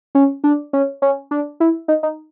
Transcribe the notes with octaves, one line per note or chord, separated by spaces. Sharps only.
C#4
D4
C#4
C#4
D4
E4
D#4
D#4